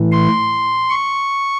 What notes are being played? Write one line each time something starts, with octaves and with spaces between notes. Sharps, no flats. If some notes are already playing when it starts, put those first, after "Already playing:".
Already playing: A2 E3
C6
C#6